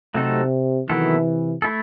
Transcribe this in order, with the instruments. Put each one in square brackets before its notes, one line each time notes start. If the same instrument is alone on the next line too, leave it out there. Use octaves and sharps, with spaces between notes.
[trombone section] C3 [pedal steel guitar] F#3 A3 C4 D#4 A4
[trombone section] C3 E3 [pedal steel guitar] D#3 F#3 B3 E4 A4
[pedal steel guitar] A3 E4 A4